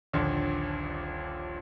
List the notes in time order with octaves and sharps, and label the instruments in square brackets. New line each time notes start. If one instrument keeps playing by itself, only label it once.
[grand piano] D#1 A#1 D#2 A#2 D3